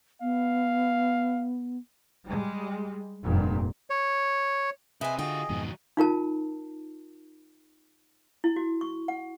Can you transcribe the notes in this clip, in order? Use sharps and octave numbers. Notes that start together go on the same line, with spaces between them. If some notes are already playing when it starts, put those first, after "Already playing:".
B3 F5
G3 G#3
F1 G2 A#2
C#5
C3 G#4 B4 D#5 E5 G#5
D3 F4 F#4 G#4 D#5 G5
F2 G#2 B2 D#3 F#3
D#4 F4 A#4 A5
E4
F#4
C#6
F#5